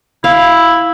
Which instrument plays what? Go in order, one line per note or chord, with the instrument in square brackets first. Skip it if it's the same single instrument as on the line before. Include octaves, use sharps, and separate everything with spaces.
[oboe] E4 [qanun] F5